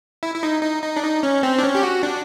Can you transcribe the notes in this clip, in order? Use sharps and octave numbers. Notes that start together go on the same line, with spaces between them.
E4
E4
D#4
D#4
D#4
D4
D#4
C#4
C4
D4
C#4
G4
F#4
D4